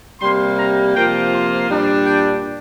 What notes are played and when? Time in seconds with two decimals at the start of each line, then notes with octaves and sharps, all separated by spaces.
0.21 C3 G3 A#3 C6
0.58 A#5
0.95 C3 F3 A#3 F4 G5
1.33 C6
1.69 A#2 G3 D4
2.06 G5